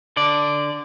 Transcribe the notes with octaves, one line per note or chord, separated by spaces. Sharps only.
D3 D5